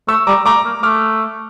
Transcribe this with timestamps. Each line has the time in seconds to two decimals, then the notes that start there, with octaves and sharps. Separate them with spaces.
0.08 A3 C#6 E6
0.27 G3 A#5 D6
0.46 A3 A#5 D6
0.65 A#3
0.83 A3 D6 F6